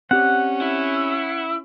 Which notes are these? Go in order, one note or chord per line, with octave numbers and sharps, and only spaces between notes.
C4 C#4 G4 D5 F#5
E4